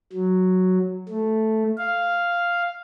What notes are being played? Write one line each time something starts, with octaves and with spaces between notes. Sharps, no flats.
F#3
A3
F5